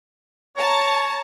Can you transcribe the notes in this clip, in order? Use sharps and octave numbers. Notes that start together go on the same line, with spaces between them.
C#5 A5 A#5